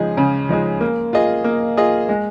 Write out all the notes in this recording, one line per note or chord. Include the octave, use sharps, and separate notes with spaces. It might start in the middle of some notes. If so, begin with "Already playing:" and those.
Already playing: C#3 F3 G#3 D#4 G#4
C#3
F3 G#3 D#4 G#4
A#3
F4 G#4 D#5
A#3
F4 G#4 D#5
G#3